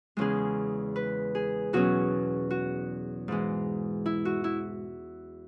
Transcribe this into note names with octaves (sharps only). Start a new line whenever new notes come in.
E2 C#3 G#3 C#4 G#4
B4
G#4
E2 B2 F#3 C#4 F#4
F#4
G#2 E3 G#3
E4
F#4
E4